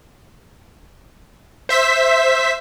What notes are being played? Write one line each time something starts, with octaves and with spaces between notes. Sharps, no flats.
C5 E5 B6